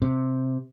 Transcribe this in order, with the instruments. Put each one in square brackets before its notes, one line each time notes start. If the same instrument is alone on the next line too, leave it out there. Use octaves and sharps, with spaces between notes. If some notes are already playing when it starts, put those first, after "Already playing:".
[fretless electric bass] C3